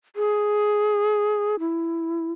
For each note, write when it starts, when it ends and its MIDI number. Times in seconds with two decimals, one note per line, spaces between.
0.16 1.56 68
1.60 2.32 64